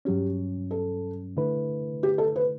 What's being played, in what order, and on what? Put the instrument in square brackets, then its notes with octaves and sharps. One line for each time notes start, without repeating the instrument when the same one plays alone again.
[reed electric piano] G2 F#3 C#4 [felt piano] G4
[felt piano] A4
[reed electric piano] D3 A3 E4 B4
[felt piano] G4
A4
B4